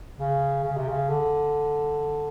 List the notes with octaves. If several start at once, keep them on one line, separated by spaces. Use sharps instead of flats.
C#3
C#3
C3
C#3
D3